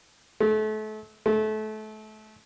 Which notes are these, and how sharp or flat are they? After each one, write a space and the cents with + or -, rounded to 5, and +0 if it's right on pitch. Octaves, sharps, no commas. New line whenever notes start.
A3 -35
A3 -30